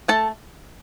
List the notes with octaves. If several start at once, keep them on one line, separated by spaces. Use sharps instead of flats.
A3 A4 A5